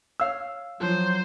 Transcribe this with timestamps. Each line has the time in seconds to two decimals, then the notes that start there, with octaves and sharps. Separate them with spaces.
0.20 C#5 F5 E6
0.81 F3 F#3 C5